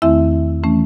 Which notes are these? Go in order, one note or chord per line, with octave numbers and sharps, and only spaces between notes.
E2 D#3 A3 C4 E4 E5
E3 A3 C#4